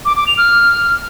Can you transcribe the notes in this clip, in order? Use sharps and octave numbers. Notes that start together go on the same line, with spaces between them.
D6
D6
F7
F6